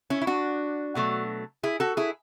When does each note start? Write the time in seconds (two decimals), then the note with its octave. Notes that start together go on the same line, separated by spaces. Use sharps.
0.10 C#4 E4
0.22 E4
0.27 D4 F#4
0.95 B2 F#3 A3
1.63 E4 G#4
1.80 F#4 A4
1.97 E4 G#4